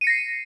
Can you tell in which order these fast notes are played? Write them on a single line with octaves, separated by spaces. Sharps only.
D#7 C#7 A#6 C7